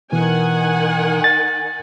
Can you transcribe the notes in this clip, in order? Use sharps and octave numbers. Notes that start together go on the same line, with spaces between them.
B2 D#3 E3 F#5 G#5
A6